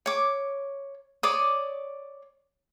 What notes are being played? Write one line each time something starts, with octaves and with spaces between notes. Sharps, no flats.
C#5 D6
C#5 D5 D6 D#6